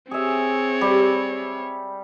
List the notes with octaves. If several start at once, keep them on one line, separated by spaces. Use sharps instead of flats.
C4 G#4 C#5 E5
G3